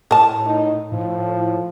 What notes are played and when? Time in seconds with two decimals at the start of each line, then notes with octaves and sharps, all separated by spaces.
0.11 A2 A#4 A5
0.46 D#4
0.92 A2 F3